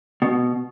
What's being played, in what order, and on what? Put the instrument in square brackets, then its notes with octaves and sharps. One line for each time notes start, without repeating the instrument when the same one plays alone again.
[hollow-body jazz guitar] B2